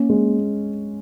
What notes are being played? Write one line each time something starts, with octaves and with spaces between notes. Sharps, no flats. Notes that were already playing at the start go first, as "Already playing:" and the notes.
Already playing: A#3 C#4
G#3